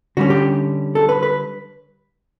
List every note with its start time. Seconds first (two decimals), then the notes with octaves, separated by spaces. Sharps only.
0.17 D3 G3 C#4 F#4
0.30 G4
0.95 A4
1.09 B4
1.23 B4